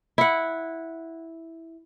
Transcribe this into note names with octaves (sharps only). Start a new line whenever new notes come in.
E4 F#5